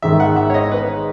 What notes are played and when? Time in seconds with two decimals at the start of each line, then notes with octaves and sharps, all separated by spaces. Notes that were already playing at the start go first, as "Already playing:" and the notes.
0.02 G#1 G#2 D#3 E5
0.20 F#5
0.36 E5
0.50 C#5
0.54 D#5
0.71 B4